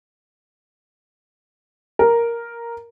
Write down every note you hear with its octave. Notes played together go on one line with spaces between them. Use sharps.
A#4